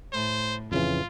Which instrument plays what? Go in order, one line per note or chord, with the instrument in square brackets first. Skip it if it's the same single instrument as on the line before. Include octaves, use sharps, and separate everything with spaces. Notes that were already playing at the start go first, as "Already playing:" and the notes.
[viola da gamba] A2 [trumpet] C5
[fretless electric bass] F2 C#3 E3 [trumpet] F4